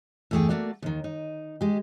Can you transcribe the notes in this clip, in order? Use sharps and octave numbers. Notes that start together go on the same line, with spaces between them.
E2 G2 A3 A#3 G#4 G5
A3 A#3 F#4 D5
D#2 D#3
D#4
G#3 G4